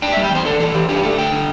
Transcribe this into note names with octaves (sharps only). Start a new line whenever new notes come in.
D4 G5
G3 E5
G5
E2 C5
D4 A4
E3 A4
E3 G4
D4 G4
A3 A4
D3 G5
D3